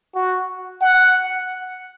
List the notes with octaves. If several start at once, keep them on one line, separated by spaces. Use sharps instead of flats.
F#4
F#5